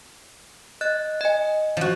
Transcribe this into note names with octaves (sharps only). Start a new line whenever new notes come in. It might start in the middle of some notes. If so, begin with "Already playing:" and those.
D#5 F#6 A6
D#5 G#5
F3 F#4